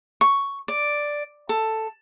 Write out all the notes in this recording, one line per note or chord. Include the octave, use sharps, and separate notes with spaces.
C#6
D5
A4